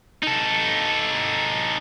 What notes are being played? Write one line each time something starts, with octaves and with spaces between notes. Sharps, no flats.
D#4 A4